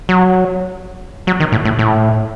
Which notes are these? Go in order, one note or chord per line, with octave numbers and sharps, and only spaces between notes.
F#3
F#3
D#3
A2
A2
A2